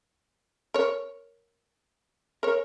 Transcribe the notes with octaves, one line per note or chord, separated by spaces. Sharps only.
A#4 C#5
A#4 C#5